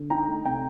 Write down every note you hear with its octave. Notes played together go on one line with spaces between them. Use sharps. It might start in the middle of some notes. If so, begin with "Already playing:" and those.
Already playing: D3
D#4 G5 A#5
A3
C3 G5 A#5